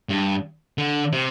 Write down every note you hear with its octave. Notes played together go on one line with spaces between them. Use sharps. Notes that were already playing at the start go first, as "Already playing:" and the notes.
G2
D3
C3